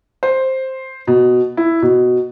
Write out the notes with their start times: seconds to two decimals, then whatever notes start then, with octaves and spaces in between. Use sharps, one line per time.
0.23 C5
1.07 B2
1.57 E4
1.82 B2